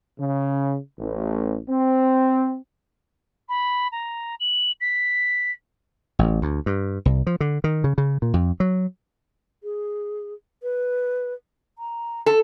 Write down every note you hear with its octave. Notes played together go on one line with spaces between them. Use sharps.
C#3
A1
C4
B5
A#5
F#7
B6
A1
D2
G2
C2
F3
D3
D#3
C#3
C#3
A#2
F2
F#3
G#4
B4
A#5
A4